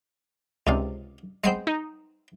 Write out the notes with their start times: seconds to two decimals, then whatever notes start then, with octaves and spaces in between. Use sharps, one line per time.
0.67 C#2 C3 D#4 D5 F5
1.44 G#3 B3 C4 G6 C7
1.67 D#4